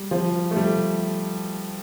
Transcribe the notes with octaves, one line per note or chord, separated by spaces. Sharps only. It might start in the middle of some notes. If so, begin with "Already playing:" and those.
Already playing: G3
F3
A3
G3